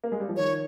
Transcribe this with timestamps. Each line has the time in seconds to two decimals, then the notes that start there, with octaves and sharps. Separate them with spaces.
0.04 A#3
0.12 G#3
0.20 G3
0.29 F3
0.36 D#3 C#5